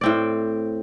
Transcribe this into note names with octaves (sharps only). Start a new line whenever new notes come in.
A2 C4 D5